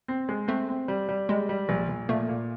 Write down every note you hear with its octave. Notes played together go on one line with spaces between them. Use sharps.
C4
G#3
A3 C4
C4
G3
G3
G3 G#3
G3
A#1
A#1
A#2 A3
A#2